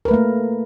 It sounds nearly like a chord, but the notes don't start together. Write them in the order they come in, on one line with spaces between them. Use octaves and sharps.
A#4 B4 A3 A#3